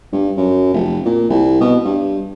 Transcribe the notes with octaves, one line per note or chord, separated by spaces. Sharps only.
G2
F#2
F1
A#2
C2
B2
G2